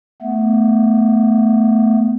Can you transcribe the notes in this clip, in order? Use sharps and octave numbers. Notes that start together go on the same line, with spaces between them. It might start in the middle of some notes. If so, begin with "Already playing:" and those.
A3 B3